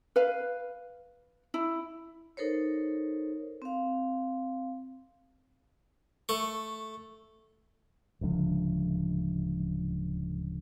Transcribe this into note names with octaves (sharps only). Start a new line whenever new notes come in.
B4 F5
E4
D#4 A4 A#4 C5 C#5
C4 F5
A3 C#6
D1 C#2 D3 F3